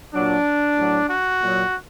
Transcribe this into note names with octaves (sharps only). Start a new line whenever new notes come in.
A#2 F#3 D4
A2 F#3
F#4
A#2 F#3